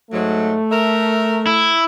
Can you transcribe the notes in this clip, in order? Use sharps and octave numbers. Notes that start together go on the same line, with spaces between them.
G#2 F#3 A3
A#4 E5
E4